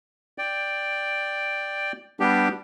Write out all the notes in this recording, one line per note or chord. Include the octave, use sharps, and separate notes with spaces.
D5 G5
G3 B3 D4 G4